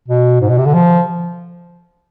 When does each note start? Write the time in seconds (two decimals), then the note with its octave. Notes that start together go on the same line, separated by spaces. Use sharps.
0.08 B2
0.41 G#2
0.49 B2
0.58 C3
0.66 D3
0.74 F3